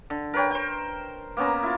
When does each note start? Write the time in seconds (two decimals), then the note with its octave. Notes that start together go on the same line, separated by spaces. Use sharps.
0.10 D3
0.34 A#4 B4 C#5 G5
0.51 C5 G5
1.37 A#3 B3 C#4 A#5
1.63 E4 F4